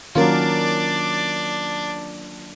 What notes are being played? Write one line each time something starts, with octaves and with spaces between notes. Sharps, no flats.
D#3 F#3 A#3 C#4 D4 F4 A#4 D5